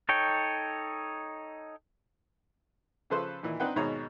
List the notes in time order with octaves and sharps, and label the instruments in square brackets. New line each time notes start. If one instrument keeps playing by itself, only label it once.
[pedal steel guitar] D#4 A4 C#5 G5
[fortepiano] C#3 F3 A4 B4 C5 C6
D#2 A#2 E3
C4 D4 D#4 B4 F#5 G5
D#2 G#2 B2 G#4 C#5 A#5